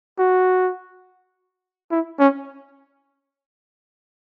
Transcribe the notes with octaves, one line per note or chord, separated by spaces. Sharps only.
F#4
E4
C#4